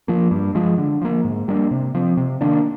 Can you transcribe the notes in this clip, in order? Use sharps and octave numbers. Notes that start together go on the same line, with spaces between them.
F3 A#3
G2
F3 G#3
D3
F3 A#3
G#2
G3 A#3 D4
C3
F3 C4
C3
D#3 A#3 D4